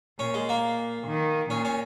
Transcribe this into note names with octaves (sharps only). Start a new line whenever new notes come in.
A#2 C#4
G#3
A#3
D#3
A#2 C#4
C#4